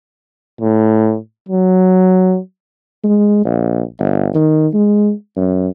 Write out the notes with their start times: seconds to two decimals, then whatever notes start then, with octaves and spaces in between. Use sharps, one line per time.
0.61 A2
1.49 F#3
3.04 G#3
3.45 A#1
3.99 G1
4.35 D#3
4.74 G#3
5.37 F#2